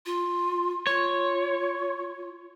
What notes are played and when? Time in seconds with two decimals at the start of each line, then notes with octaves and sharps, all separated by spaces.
0.06 F4
0.87 F4 C#5